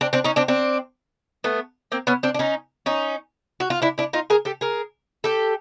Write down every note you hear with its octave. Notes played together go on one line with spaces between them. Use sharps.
C4 D4
C4 D4
C#4 D#4
C4 D4
C4 D4
A3 B3
A#3 C4
B3 C#4
C4 D4
D4
C#4 D#4
C#4 D#4
F#4
F4
D4 E4
D4 E4
D#4 F4
G#4 A#4
G4 A4
G#4 A#4
G4 A4